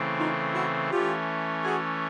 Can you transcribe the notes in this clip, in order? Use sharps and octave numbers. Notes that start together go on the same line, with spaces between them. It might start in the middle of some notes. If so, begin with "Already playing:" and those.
Already playing: C#3 E3 A3 C4
D#4 F4
E4 F#4
E3 A3 C#4 F4 G4
F#4 G#4